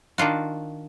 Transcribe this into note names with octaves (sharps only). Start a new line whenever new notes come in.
D#3 D4 F4 F#4